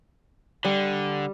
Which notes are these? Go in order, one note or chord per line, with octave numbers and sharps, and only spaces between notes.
D3 G3